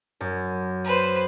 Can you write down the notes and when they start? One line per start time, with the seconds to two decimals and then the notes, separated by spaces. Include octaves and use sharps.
0.21 F#2
0.84 B4 C5